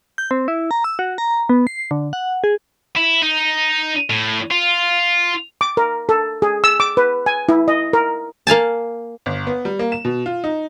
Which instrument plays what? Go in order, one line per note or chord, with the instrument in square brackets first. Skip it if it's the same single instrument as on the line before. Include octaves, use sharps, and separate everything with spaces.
[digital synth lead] G6
C4
E4
A#5
E6
F#4
A#5
B3
C7
D3
F#5
G#4
[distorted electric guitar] E4
D#4
A2
F4
[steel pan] D6
A#4
A4
G#4
E6
D6
B4
G#5
E4
D#5
A#4
[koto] A#3 F5 G#5 A5
[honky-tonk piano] G1
B3
G3
A#3
E7
B2
F4
D#4